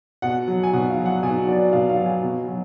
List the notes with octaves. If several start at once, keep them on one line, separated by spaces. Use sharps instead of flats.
B2 F#5
F#3
G#5
B2 F#5
F5
F#3
F#5
B2 G#5
F#3 D5
B2 F5
F5
F#3
G#5
B2
F#3